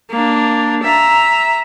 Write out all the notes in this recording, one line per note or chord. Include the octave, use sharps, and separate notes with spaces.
A#3 D4
E5 A#5